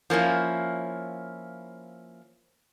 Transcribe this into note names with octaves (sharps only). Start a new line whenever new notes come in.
F3 A#3 C#4 E4